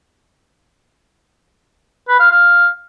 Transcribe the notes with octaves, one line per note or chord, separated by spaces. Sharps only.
B4
F5
F5